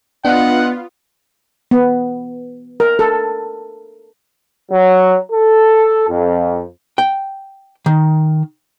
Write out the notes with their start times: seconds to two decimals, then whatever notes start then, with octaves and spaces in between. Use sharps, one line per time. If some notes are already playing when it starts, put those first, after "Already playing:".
0.25 B3 D4 F4 D#5 F#5
1.71 B3
2.80 A#4
2.99 A4
4.71 F#3
5.31 A4
6.08 F2
6.98 G5
7.86 D#3